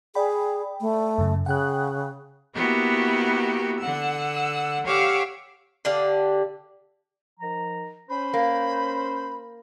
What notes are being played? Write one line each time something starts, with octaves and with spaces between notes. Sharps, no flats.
G#4 D5 G5 B5
A3
F#2 C#3
C#3 F#5 G5 F#6
A#3 B3 E4 F#4 G4
D3 F#5 E6
G4 C#5 F5 F#5 D6 E6
D3 G4 D5 F5
D#3 F3 A#5
C#4 C5 B5
A#3